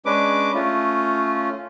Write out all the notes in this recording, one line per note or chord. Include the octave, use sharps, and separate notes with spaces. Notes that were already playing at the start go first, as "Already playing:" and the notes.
G#3 C#4 D4 B4 D6
A3 C#4 F4